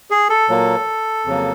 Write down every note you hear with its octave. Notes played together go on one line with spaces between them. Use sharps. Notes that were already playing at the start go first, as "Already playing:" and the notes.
G#4
A4
A#2 F#3 A#3
F2 C#3 F#3 A#3